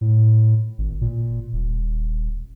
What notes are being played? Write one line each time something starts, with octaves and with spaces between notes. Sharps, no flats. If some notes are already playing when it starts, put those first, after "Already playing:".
A2
G#1
A#2
D#1